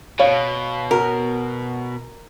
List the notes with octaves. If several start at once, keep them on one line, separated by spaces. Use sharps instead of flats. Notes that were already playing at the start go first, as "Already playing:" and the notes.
B2 C#5 F5
F#4 A#4